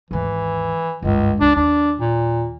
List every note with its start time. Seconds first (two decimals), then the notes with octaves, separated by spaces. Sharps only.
0.11 G#1 D#2 E3
1.02 G1 C#2 G#2
1.41 C#2 D4
1.56 D#2 D4
2.00 A#2